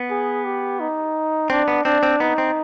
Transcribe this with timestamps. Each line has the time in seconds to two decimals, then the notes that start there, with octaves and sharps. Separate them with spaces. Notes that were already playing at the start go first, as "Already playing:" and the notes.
Already playing: B3
0.11 G#4
0.45 G4
0.80 D#4
1.50 C4 D4
1.68 B3
1.85 C4 D4
2.03 C4
2.20 B3 D#4
2.38 C4